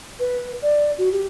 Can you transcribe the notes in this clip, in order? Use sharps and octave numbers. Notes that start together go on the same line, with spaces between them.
B4
D5
F#4
G4